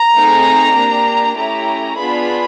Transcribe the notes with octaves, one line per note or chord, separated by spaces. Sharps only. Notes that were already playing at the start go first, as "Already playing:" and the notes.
Already playing: A#5
A3 C4 D#4 G#4
A#3 D4 G4
A3 C#4 E4 G4 A#5
B3 D4 F4 G#4 B5